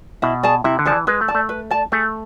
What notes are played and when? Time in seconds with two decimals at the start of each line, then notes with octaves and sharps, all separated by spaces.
0.22 B2 E4
0.43 G#4 D5 A5
0.64 C3 E4
0.79 D3
0.85 F3 G#4 D5 A5
0.92 E3
1.07 G#3 B4
1.21 A3
1.28 D5 A5
1.35 A3
1.49 B4
1.70 D5 A5
1.92 A3 G#4